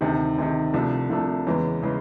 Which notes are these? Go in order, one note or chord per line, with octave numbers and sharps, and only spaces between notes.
D2 C3 D#3
D2 C3 D#3
C2 C3 F3 A3 D4
C2 C3 F3 A3 D4
E2 C#3 E3 G#3 C#4
C#3 E3 G#3 C#4